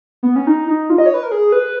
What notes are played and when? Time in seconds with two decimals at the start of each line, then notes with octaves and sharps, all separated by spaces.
0.23 B3
0.36 C#4
0.47 D#4
0.68 D#4
0.90 F4
0.98 D#5
1.06 C#5
1.14 B4
1.23 A#4
1.32 G#4
1.52 B4